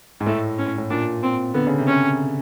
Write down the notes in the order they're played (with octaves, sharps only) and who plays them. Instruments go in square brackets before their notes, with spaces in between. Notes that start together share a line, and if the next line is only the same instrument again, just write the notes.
[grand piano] G#2
[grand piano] A2 [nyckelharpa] A3
[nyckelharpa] C#4
[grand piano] A2
[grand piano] A#2 [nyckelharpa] D4
[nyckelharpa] C4
[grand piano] D3 [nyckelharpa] B3
[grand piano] C#3
C3
[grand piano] C#3 [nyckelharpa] C#4